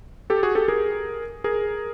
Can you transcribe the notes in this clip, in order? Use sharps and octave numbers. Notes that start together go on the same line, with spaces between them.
G4 A4
F#4 G#4
G4 A4
G#4 A#4
G#4 A#4